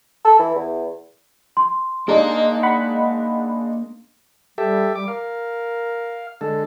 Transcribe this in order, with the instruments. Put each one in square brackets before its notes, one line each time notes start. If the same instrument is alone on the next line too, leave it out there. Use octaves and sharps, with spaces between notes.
[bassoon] A4
E3
E2
[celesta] C6
[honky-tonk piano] G#3 D4 D#4 [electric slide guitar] A#3 A#4 A#5
[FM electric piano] F#5 B5
[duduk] G3 [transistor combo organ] G4 A4 E5
[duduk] G3 [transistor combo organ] D6
[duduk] A#4 [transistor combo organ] F5
[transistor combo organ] D3 G#3 A4